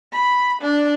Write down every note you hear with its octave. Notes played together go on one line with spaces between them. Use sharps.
B5
D4